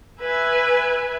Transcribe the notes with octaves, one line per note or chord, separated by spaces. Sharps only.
B4 E5 G#5